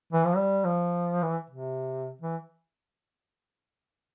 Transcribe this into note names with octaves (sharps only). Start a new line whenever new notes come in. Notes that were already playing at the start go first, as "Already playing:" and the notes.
E3
F3
G3
F3
E3
C3
E3